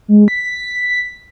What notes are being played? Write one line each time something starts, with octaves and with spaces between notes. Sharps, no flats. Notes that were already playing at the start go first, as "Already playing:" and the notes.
G#3
B6